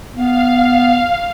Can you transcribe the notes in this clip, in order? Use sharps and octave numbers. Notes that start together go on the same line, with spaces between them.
B3 F5